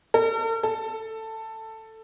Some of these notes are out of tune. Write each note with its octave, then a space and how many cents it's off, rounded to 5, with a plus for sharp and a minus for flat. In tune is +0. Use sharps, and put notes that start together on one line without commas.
A4 +45
A4 +10